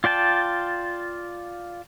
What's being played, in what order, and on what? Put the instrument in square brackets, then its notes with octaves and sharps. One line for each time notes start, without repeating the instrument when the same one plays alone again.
[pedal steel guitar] F4 D5 G5 A5